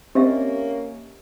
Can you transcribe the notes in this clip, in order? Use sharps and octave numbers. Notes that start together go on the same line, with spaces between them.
A#3 C4 C#4 G4 D#5 E5